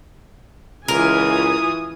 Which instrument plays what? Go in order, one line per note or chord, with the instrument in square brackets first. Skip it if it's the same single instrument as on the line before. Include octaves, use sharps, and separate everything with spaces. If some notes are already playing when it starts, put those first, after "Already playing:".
[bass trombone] C#2 [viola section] E3 F4 G#5 [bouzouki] A#4 [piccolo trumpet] D#6